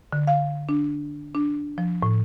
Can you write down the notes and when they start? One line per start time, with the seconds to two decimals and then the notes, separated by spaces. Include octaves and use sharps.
0.13 D3
0.27 F5
0.69 D4
1.35 D4
1.78 F3
2.03 A2